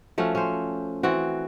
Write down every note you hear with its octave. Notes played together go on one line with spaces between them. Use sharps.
F3 A3 C#4 F#4
C#4 C5
E3 C4 F#4